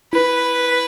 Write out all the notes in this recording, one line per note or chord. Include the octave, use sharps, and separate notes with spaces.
E4 B4